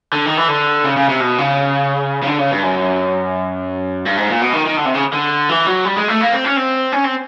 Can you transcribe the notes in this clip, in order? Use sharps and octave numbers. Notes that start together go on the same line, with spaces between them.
D3
D#3
E3
D3
C#3
C#3
C3
B2
C#3
C#3
D3
C#3
G2
F#2
G2
G#2
A#2
B2
D#3
D#3
D3
C3
C#3
D3
E3
F#3
G3
G#3
A3
A#3
C4
C#4
C4
C#4
C4